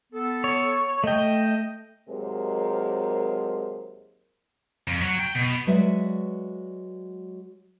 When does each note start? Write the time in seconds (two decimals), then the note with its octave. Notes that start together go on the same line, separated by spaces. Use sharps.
0.13 B3 A4
0.44 C#5
1.04 A3 D#5 G5
2.09 D#2 C3 F#3 G#3 A#4 C5
4.88 F2
5.02 F#3
5.19 G5
5.35 B2
5.67 F#3 G#3 F#4 B4 D5 E5